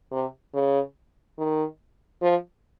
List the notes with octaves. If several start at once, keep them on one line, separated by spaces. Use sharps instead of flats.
C3
C#3
D#3
F3